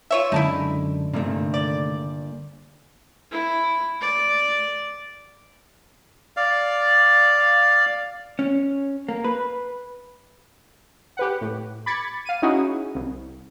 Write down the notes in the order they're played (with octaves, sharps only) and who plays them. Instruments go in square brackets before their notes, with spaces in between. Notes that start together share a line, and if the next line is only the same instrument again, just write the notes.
[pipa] F4 C#5 E5
[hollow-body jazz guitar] F#2 G#3 A5 [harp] D3 [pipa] D#4 E4
[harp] G1 A#3 [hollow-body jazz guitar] C3 D#3 A3
[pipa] D5
[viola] E4
D5
[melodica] D5 F5
[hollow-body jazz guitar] C#4
A#3
B4
[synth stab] G4 B4 F#5
A2
B5 D6 G#6 A6 C#7
F5 D#7
C#4 D#4 E4 F#4 G#4
C2